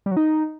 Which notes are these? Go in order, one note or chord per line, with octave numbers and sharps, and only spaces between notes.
G3
F#3
D#4